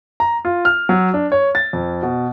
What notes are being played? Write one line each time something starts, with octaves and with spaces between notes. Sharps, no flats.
A#5
F4
F6
F#3
D4
C#5
A6
F2
B2